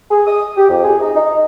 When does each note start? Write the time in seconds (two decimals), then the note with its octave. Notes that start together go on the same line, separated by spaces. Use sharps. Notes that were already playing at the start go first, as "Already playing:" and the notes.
0.11 G#4
0.27 D#6
0.57 G4
0.69 F2
0.83 G#4
1.00 D#4
1.16 D#4